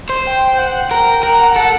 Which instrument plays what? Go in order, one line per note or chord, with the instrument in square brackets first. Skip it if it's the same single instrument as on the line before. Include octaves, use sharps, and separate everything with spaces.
[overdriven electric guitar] C5
[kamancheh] G5
F#5
[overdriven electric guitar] A#4 [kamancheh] G5
[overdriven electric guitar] A#4 [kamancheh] F#5
[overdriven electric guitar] A4